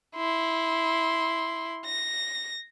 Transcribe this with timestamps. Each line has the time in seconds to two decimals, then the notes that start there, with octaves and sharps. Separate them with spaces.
0.16 E4 C6
1.85 A#6